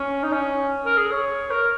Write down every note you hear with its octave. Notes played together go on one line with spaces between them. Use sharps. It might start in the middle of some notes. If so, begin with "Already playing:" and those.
Already playing: C#4
D#4
C#4
A#4
G#4
C#5
A#4